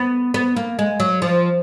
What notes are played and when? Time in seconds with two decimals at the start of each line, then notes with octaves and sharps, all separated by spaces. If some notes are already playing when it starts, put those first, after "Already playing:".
Already playing: B3
0.34 B3
0.56 A#3
0.79 G#3
1.00 F#3
1.22 F3